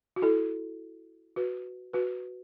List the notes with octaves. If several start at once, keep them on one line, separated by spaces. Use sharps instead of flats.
F#4
E4 A4
F#4 B4
F#4 B4